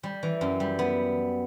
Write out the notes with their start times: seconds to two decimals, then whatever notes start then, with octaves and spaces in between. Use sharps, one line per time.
0.03 G3
0.23 E3
0.41 F#2
0.60 G3
0.79 B3